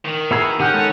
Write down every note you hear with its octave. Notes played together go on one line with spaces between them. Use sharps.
D#3
B3 E4 F#4 G#4 A#5
D#3 C#4 G4 F#5 G5 F6
G#3 B3 A4